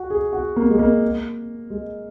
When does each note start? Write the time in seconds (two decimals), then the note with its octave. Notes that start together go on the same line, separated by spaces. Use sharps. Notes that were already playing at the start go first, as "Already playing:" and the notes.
Already playing: F#4
0.10 G#4
0.33 F#4
0.56 A#3
0.70 G#3
0.79 A#3
1.70 G#3